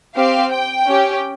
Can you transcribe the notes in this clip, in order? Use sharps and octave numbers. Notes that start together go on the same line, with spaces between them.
C4 G4 F5
G5
C#4 G4